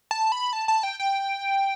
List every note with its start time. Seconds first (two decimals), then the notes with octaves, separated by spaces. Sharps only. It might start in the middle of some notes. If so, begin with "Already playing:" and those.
0.11 A5
0.32 B5
0.53 A5
0.68 A5
0.83 G5
1.00 G5